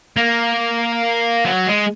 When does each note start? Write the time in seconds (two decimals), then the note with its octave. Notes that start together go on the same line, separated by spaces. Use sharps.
0.17 A#3
1.45 F#3
1.67 G#3